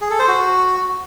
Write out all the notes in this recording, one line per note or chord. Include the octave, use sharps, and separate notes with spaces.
G#4
A4
C5
F#4